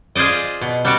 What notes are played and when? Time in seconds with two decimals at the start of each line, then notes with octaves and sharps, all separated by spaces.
0.15 F4 G#4 C5 D5 D#5
0.61 B2
0.85 G3 F#4 D5